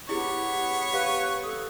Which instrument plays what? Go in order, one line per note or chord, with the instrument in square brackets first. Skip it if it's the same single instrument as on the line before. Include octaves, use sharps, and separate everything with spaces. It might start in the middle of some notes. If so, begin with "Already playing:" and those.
[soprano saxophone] B3 [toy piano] E4 G#4 [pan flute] G4 [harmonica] C#5
[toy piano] G4 F5 [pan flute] B4
[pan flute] A4 [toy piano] D#6